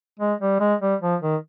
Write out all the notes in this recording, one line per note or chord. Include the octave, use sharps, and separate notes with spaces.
G#3
G3
G#3
G3
F3
D#3